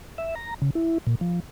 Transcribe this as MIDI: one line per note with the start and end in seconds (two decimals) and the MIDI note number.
0.18 0.35 76
0.35 0.54 82
0.62 0.70 49
0.75 0.98 64
1.07 1.15 46
1.21 1.40 53